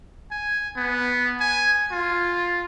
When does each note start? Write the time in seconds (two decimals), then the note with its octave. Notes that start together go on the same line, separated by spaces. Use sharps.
0.31 G#5
0.77 B3
1.40 G#5
1.91 F4